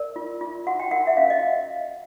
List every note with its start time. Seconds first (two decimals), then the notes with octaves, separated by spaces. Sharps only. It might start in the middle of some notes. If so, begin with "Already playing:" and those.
Already playing: A#4 D5
0.16 F4
0.41 F4
0.67 F#4 F#5
0.80 G5
0.91 A#4 F#5
1.07 E5
1.17 C#4 F5
1.30 D#5